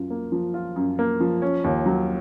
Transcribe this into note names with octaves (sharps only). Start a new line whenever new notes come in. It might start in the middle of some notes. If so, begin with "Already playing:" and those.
Already playing: F#2 F4
A#3
F3
F4
F#2
A#3
F3
C#4
D#2
F#3